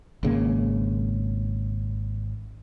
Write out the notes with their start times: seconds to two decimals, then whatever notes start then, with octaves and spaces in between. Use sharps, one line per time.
0.23 G#1 C#3 A#3